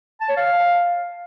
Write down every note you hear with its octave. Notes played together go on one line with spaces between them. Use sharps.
A5
C#5
F5